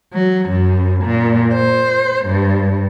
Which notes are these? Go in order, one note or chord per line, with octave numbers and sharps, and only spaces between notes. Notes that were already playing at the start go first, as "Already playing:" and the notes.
F#3
F#2
A#2
C5
G2